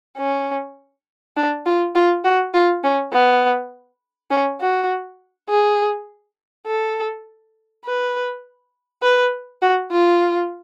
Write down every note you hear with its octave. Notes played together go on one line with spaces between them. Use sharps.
C#4
D4
F4
F4
F#4
F4
C#4
B3
C#4
F#4
G#4
A4
B4
B4
F#4
F4